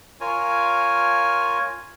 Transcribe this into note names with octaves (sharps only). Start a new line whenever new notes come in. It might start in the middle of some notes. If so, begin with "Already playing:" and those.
F4 A#4 C#5 G#5